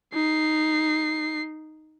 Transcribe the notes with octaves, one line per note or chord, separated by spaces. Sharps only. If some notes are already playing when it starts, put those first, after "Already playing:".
D#4 C7